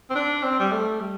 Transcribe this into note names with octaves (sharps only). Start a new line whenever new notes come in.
C4
D4
C4
G3
A3
G3